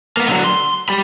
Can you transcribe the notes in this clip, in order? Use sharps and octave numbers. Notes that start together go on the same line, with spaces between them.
A#3 B3
D3 F#3
C6
G4 B5